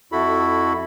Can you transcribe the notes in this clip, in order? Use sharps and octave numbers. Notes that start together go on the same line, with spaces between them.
F2 E4 F#4 A4 B5